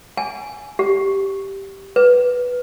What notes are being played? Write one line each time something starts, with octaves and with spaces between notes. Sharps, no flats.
G#5
G4
B4